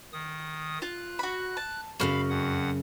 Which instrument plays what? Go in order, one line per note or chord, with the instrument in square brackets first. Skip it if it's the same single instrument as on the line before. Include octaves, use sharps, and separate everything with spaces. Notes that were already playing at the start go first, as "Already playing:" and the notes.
[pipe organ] D#3 D#6
[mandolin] F4 [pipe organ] F#6
[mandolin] F#4 B5
A5
[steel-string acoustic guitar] F#2 A#2 C#3 [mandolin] F#4 F6 [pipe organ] F5 B5
[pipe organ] F2 F#5